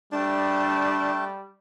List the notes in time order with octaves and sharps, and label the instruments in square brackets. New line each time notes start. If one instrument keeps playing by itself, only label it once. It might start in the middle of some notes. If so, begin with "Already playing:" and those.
[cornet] G3 [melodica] A3 G5 A5 [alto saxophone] D4